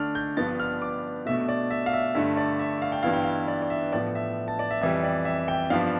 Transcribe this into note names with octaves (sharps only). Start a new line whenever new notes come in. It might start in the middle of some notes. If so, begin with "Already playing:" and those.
Already playing: D3 A3 D4 F6
G6
G2 F3 B3 D4 A6
F6
D6
B2 A3 D4 E5
D5
E5
F5
E5
G2 D3 A3 E5
D5
E5
F5
G5
G2 E3 B3 E4 F5
G5
F5
D5
D5
E5
A2 F3 B3 D5
E5
A5
D5
E5
F2 E3 G3 E5
D5
E5
G5
G2 F3 B3 D4 F5